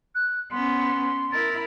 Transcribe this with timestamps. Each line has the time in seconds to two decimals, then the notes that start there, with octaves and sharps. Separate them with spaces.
0.15 F#6
0.51 B3 C#4 C6
1.32 E4 A#4 A6